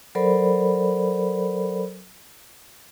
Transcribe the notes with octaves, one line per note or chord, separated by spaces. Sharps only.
F#3 A4 A#4 C5 D5 B5